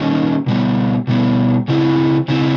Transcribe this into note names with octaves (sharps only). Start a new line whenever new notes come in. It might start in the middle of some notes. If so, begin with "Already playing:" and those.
Already playing: D#3 G3 A#3 C#4
B2 G3 B3
B2 G3 B3
C#3 E3 C4 E4
C#3 E3 C4 E4